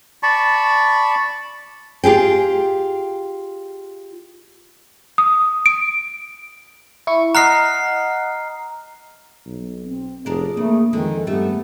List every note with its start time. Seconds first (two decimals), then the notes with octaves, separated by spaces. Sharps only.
0.23 D5 A5 B5 C#6
2.04 F4 G4 G#4 G5
5.18 D#6
5.66 D7
7.07 E4 C#6
7.35 D#5 F#5 A#5 F6 C7
9.46 B1
9.84 C4
10.26 F1 D4 G#4 A#4
10.57 C#3 A3 A#3
10.93 F2 D3 D#3 G#3
11.27 G2 A3 B3 G4